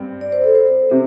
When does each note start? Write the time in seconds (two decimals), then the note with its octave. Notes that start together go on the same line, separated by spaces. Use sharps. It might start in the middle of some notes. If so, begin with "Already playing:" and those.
Already playing: G2 C4
0.21 D5
0.32 C5
0.44 A4
0.55 C5
0.90 C3 C4